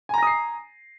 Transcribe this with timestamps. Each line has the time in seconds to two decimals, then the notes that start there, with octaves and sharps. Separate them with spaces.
0.09 G#5
0.14 A#5
0.18 A#6
0.23 D#6
0.27 C7